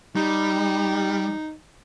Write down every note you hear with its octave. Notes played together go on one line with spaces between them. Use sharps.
G3 D#4